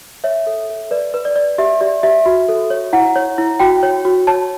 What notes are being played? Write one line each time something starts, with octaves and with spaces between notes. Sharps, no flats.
C#5 E5
A4
A4
B4 D5
B4
D5
D5
G4 E5
G4 D5
G4 E5
F#4
A4
C#5
E4 F#5
C#5
E4
F#4 G5
C#5
F#4
C#5 A5